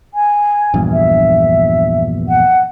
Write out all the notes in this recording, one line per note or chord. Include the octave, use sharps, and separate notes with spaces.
G#5
A#1 E2 G2
E5
F#5